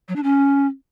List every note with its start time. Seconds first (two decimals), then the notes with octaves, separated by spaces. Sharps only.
0.08 F#3
0.16 D4
0.23 C#4